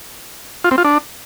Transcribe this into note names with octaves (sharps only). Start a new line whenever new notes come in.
F4
C4
F4
D4